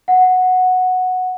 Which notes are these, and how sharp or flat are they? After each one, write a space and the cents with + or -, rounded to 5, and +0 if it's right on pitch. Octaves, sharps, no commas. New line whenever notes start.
F#5 -5